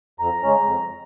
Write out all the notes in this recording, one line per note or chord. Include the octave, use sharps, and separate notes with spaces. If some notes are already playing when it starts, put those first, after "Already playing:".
F2 A#5
C#3 G#3 C#4
F2